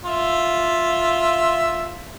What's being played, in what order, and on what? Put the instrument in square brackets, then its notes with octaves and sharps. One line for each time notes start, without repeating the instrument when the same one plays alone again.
[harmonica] F4 E5